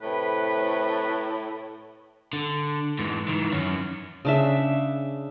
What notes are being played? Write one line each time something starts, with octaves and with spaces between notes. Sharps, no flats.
A2 C3 B4
D3
G#2 E3
D#3 E3
F#2 C#4
C#3 D4 E5